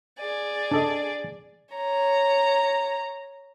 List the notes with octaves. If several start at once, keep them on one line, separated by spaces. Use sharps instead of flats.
G#4 D5
D4 A4 D#5
C#5 A#5